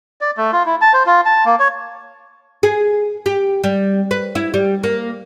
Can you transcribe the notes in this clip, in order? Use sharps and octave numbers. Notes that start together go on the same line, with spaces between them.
D5
A3
F4
E4
A5
C5
F4
A5
A#3
C#5
G#4
G4
G3
B4
E4
G3
A#3